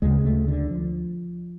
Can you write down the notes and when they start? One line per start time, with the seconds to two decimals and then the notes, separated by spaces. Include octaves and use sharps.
0.02 D2 C#3 G#3
0.25 A3
0.48 D3
0.71 F3